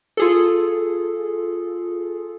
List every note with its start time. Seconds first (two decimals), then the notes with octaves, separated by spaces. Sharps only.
0.17 F4 G#4 A4